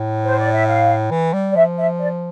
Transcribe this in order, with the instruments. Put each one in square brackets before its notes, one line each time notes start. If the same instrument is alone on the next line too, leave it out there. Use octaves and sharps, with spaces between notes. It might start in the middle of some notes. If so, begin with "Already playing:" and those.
Already playing: [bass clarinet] A2
[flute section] C5
D5
E5
F5
[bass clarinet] E3
G3
[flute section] D5
[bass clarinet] F3 [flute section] E5
[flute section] E5
D5